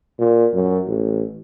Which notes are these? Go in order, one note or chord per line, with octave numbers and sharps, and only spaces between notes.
A#2
F#2
A1